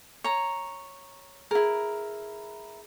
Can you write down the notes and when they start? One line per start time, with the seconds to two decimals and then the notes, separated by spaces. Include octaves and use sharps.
0.24 C#5 A#5
1.51 E4 G#4 A#4